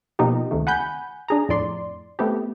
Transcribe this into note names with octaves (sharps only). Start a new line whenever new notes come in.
B2 F3 A#3 D#4 F4 G4
C#2 C3 D#3 A3
F#5 G#5 B5 G6
D4 G#4 A#5
F2 A2 D5 C6
A3 B3 C4 G4